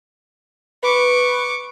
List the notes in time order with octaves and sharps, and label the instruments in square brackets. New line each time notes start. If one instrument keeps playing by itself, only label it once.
[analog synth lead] B4 [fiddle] C#6 D6